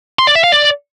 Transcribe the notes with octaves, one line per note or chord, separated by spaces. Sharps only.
C6
D5
E5
F5
D5